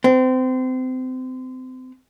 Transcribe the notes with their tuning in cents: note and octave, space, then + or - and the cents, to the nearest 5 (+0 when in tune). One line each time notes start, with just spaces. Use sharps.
C4 -30